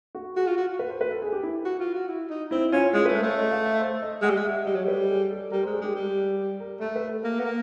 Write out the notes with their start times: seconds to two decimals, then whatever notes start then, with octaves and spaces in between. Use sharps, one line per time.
0.15 F#4
0.37 F#4 G#4
0.47 F4
0.57 F#4
0.79 B4
0.90 C5
1.01 B4
1.12 A4
1.22 G#4
1.32 G4
1.43 E4
1.65 F#4
1.80 F4
1.94 F#4
2.08 E4
2.30 D#4
2.51 C4 E4
2.72 C#4 F4
2.94 G#3 F4
3.05 A3 B4
3.15 C5
3.23 A3 C#5
3.37 D#5
3.51 F5
3.65 E5
3.80 C5
4.02 D#5
4.22 G#3 F#5
4.30 G3
4.37 G#3
4.44 E5
4.66 G3 D#5
4.75 F#3 C#5
4.84 G3 B4
4.98 A4
5.09 G#4
5.30 A4
5.51 G3 A#4
5.63 G#3 C5
5.73 G#4
5.81 G#3 G4
5.95 G3
6.60 A#4
6.81 A3 A4
6.96 B4
7.24 A#3
7.40 B3
7.45 A#3